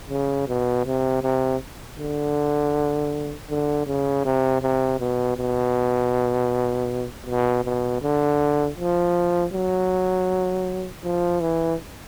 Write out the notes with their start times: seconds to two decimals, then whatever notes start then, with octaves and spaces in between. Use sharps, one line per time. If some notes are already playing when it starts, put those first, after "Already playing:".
0.10 C#3
0.48 B2
0.86 C3
1.23 C3
1.99 D3
3.50 D3
3.87 C#3
4.25 C3
4.62 C3
5.00 B2
5.37 B2
7.26 B2
7.64 B2
8.02 D3
8.77 F3
9.53 F#3
11.04 F3
11.41 E3